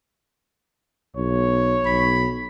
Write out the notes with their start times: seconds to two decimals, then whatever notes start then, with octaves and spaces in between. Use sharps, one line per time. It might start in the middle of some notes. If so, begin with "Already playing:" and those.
1.17 B1 C#5
1.85 B1 B5